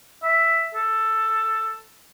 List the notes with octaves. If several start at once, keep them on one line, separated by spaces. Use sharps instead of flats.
E5
A4